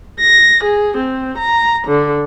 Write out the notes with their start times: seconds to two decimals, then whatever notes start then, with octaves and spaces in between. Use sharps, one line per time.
0.20 A#6
0.64 G#4
0.97 C4
1.39 A#5
1.88 D3